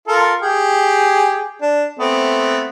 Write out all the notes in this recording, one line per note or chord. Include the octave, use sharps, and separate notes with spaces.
F4 A4 A#4
G4 G#4 G5
D4
A3 B3 C4